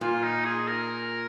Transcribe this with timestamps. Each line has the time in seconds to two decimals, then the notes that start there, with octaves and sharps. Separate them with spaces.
0.01 A#2 F4
0.23 D#4
0.45 G#4
0.68 A#4